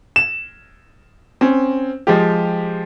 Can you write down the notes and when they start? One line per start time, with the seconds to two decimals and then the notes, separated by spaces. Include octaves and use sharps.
0.16 E7
1.41 C4 C#4
2.07 F3 G#3 G4